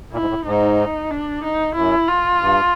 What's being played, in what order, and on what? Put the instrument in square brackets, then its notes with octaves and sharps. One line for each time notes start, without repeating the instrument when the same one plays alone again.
[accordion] A#2 [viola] E4
[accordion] G#2
A2
[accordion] G#2 [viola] D#4
[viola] D4
D#4
[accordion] F#2 [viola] E4
[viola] F4
[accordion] G2